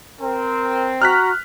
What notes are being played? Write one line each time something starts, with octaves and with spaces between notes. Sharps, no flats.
C4 A#4
F#4 A#5 F6 F#6 B6